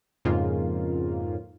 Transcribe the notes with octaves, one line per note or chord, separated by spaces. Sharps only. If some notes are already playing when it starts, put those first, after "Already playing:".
F2 G#2 C#3 A#3 F4